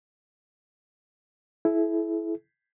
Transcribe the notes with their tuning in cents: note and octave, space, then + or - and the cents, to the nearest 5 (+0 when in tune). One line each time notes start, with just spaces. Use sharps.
E4 +0 A4 -45